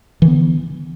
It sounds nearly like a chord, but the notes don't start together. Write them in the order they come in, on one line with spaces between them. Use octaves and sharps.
E3 D3 B3